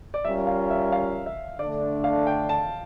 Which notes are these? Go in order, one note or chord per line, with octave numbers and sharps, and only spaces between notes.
D5
G3 C#4 F4 A#4 E5
F5
E5
F5
E5
D3 A3 D4 D5
F5
G5
A5